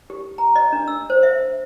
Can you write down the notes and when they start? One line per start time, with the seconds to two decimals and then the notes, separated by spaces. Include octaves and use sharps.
0.10 G4
0.38 A#5
0.56 D#5
0.73 D4
0.88 E6
1.10 C5
1.23 E5